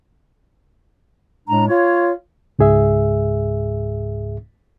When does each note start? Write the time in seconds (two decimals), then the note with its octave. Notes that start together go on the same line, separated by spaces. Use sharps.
1.48 A2 G#3 D4 A#5
1.68 F4 C#5
2.59 C#2 G#2 G#4 E5